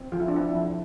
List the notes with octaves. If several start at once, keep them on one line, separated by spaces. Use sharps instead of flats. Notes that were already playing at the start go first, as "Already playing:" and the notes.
Already playing: C4
F3 F4
E4
D4
C4 E4
F3